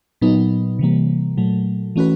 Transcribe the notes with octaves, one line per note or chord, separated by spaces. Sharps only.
A#2 F#3 B3 D#4
C3 E3 G3 A#3
A#2 F#3 A3
E3 A3 C#4 F#4 B4